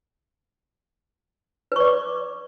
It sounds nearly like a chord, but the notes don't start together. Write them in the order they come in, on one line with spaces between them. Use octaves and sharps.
B4 C#6 D5 D6